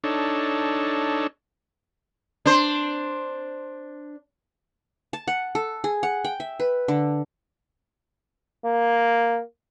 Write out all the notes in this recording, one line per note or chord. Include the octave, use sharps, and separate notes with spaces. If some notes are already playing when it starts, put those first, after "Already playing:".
D4 D#4 A4 C#5
D4 C5
A5
F#5
A4
G#4
F#5
G5
E5
B4
D3
A#3